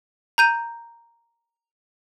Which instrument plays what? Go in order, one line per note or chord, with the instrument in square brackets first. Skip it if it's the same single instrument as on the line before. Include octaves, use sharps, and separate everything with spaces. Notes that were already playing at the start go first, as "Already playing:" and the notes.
[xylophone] A#5 G6 D#7